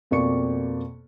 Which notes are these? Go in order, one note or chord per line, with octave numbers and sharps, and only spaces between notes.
F2 B2 A#3 D5 C#6 C#7